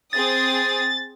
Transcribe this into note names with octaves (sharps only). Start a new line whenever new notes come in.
C4 G#4 D#6 A6